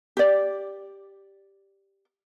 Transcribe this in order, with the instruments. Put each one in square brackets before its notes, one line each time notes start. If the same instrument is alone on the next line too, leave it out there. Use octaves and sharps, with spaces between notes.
[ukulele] G4 D5